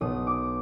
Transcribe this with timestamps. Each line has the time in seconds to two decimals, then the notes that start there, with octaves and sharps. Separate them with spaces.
0.01 B1 B2 D#6
0.27 D6